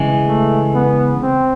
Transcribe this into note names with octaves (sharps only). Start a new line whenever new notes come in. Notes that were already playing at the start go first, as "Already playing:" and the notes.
Already playing: C#3 E3 G#3
A3
B3
C4